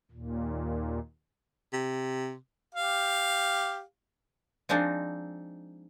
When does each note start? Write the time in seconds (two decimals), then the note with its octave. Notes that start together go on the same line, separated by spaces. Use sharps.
0.11 D#2 A#2
1.73 C3
2.75 G4 F5
4.69 F3 G#3 C4 D4 D#4